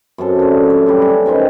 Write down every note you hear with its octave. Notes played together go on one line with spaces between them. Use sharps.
F#2 C3 A4 C6
D3 A3
C#5
D3 E3 G3
C#4
C3 D#3 C4 B4